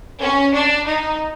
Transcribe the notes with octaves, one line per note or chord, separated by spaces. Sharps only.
C#4
D4
D#4